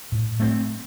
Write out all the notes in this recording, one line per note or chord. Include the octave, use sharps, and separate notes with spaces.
A2
A3 C4